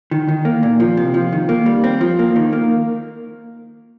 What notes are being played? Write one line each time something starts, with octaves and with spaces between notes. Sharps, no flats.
D#3
D#3
A#3
A#2
F3
C3
F3
D#3
A#3
G3
C4
F3
A#3
D#3
A#3